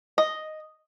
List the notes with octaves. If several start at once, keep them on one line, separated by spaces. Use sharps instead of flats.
D#5